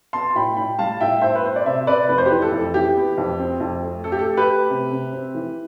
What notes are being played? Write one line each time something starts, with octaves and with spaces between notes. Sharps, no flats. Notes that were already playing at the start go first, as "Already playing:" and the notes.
B3 A5 C6
C6
A2 G5 B5
A2 G5 B5
G3 F5 A5
A2 E5 G5
A2 C5 E5
B4
B3 C5
D5
C3 C5 E5
C3 B4 D5
F2 B4
C5
E3 G4 B4
A4
F2
E3 G4
B3
F2
C4
F2
A3
A3 A4
G4
A4
A3
G4 B4
A3
C3
C3
C4
E3